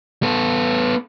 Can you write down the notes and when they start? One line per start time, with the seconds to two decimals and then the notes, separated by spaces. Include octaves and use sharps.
0.23 B3 A4